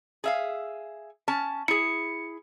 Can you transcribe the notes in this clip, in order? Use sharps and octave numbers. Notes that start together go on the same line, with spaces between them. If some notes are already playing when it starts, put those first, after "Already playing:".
G#4 E5 F5
C#4 A5
E4 G#4 C#7